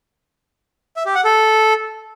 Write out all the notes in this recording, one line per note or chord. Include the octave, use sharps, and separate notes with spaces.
E5
G4
F#5
A4